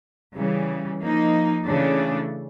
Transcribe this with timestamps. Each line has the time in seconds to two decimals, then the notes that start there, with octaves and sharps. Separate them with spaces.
0.35 C#3 E3 G3
1.00 F3 A#3 D#4
1.63 C#3 E3 A3 D4